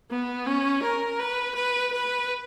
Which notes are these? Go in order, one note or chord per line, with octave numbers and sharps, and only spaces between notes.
B3
C#4
A#4
B4
B4
B4